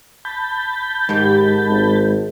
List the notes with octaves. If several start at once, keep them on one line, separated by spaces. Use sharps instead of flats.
A5 B5 G6
G#2 D#3 G4
G#1